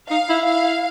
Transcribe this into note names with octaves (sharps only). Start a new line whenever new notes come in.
D#4 F5
E4
F5